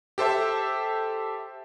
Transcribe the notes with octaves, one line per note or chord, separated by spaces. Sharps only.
G4 A4 C5 E5 A5